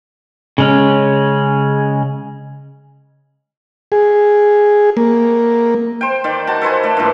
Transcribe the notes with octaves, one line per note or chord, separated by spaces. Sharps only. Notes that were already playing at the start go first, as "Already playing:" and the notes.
C#3 G#3 C#4
G#4
A#3
C5 G5
D#3 D5
F#4 A5
A4 B4 C5 G#5
A3 D5
G2 A#2 E3